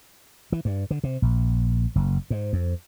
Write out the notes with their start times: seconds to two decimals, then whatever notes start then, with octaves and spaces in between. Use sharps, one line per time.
0.52 E3
0.65 G2
0.91 D3
1.04 C3
1.22 A#1
1.95 F#1
2.30 G#2
2.53 F2